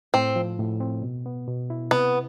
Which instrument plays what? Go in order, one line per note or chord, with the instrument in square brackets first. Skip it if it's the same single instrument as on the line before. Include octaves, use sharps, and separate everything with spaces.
[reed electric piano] A2 [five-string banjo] C4
[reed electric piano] F3
A2
C4
B2
B3
B2
E4
[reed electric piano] C3 [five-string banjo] B3